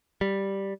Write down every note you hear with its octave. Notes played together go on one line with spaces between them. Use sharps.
G3